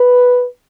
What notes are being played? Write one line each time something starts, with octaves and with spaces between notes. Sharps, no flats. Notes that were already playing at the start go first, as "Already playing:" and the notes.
Already playing: B4